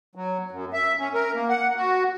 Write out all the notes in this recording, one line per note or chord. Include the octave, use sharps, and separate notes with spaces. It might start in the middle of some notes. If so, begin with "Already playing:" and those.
F#3
F#2
E5
C#4
A#4
A#3
F#5
F#4